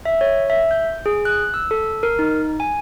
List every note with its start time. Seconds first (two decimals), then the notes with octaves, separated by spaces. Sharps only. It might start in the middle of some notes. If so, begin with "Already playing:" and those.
0.05 E5
0.21 C#5
0.50 E5
0.71 G6
1.06 G#4
1.25 F#6
1.54 E6
1.71 A4
2.03 A#4
2.19 D#4
2.60 G#5